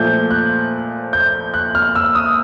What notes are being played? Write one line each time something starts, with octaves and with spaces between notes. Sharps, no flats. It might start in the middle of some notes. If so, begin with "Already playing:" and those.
Already playing: A#2 F3 A3 G6
F#6
G6
F#6
F6
E6
D#6